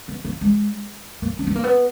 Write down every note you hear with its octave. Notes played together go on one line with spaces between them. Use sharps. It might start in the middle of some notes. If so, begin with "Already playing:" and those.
B3
A#3
G#3
A#3
C#4
B3
A#3
B3